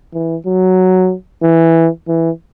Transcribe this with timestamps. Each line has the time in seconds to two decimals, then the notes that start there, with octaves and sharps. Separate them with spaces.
0.14 E3
0.46 F#3
1.43 E3
2.08 E3